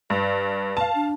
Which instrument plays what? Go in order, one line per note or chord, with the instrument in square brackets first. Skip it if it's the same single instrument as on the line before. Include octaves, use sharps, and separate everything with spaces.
[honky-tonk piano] G2 [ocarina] B4
[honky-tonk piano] F5 A5
[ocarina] D4